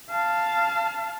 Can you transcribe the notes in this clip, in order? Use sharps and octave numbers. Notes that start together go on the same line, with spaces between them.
F5 A5